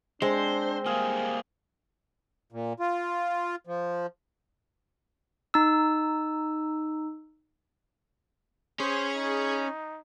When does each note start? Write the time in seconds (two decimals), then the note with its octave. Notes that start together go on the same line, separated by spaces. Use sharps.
0.22 G#3 C4 D4 C5
0.86 G3 A#3 G#4 F5 G#5
2.52 A#2
2.80 F4
3.67 F3
5.54 D#4 E6
8.80 C#4 G#4 C5 G#5 B5 C#6
9.14 D#4